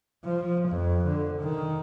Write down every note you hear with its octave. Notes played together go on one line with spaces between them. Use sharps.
F3
F2
D3
D#3